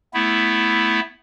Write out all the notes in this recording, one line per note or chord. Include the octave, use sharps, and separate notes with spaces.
A3 B3 E4